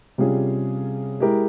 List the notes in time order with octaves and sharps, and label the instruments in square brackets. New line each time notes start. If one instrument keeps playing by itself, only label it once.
[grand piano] C3 G3 C#4 F4 G#4
G#3 E4 G4 A#4